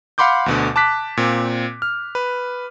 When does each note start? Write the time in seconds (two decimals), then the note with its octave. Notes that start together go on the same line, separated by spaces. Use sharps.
0.18 F5 F#5 B5 C6 D6 G6
0.46 D2 B2 D3
0.76 A5 D6 F#6 B6
1.17 A#2 C4
1.82 F6
2.15 B4